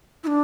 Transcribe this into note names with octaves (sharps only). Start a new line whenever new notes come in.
E4
D4